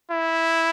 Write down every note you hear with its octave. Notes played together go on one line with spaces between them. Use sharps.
E4